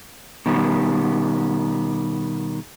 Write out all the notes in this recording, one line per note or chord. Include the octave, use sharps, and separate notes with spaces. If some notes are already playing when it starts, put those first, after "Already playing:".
B2 D#3 G3